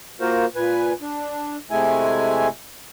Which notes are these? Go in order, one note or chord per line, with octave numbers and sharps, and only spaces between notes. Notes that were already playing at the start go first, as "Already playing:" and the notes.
A#3 F4 F#4 A#4 C5
A#2 B4 G#5
D4
C3 G#3 A3 E4 G#5